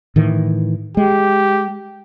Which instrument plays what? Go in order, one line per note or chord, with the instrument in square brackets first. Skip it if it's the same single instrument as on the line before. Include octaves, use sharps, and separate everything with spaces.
[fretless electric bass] A2 D#3 E3
[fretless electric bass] G#3 [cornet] G4